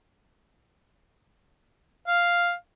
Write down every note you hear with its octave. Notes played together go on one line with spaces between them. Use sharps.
F5